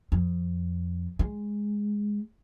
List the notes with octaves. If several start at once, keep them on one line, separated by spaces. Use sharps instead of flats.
F2
G#3